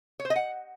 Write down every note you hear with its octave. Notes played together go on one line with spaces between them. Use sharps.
C#5
C5
D#5
F#5